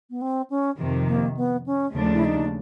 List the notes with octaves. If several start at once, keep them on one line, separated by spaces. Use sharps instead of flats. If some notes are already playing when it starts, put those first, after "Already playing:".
B3
C4
C#4
F2 C3 D#3
A#3
B3
C#4
D#2 C#3 F3 A3 D4
E4
D#4